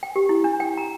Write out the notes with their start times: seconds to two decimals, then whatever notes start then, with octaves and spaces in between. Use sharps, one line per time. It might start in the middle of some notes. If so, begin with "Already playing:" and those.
0.03 G5
0.16 G4
0.29 E4
0.44 D4
0.60 G5
0.77 A#5